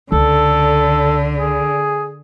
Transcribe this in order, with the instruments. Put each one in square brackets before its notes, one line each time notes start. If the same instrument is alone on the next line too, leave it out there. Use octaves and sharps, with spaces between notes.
[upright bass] C#2 [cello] D3 [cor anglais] A4
[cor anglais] G#4